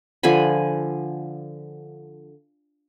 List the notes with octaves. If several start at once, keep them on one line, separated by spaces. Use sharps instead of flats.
D3 F3 G#5 B5